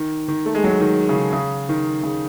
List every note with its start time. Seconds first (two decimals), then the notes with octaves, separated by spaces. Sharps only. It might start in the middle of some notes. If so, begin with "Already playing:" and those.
Already playing: D#3
0.28 D#3
0.45 A3
0.55 G#3
0.64 F#3
0.80 D#3
1.09 C#3
1.15 D#3
1.33 C#3
1.69 D#3
2.03 C#3